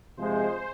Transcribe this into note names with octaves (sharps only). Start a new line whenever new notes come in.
C3 F3 G#3 C5